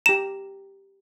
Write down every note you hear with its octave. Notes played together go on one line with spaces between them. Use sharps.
G4 A#5 E7